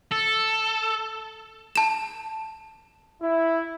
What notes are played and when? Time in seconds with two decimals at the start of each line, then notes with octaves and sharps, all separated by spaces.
0.11 A4
1.76 A5 E7
3.21 E4